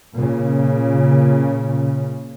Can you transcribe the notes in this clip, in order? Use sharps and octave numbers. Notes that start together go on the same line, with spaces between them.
A#2 C#3